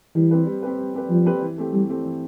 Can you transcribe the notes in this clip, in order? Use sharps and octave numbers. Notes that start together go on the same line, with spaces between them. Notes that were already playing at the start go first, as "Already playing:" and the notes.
E3 G3
C4 G4 B4
G3
C4 G4 B4
G3
C4 G4 B4
F3 G3
C4 G4 B4
E3
A3 C4 G4
E3 G3
A3 C4 G4
E3